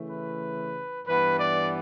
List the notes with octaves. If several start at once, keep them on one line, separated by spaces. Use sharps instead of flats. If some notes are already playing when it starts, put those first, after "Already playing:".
Already playing: C#3 E3 A3
B4
G2 E3 B3 B4
D5